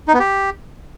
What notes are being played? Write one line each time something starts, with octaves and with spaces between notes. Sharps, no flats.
D#4
B3
G4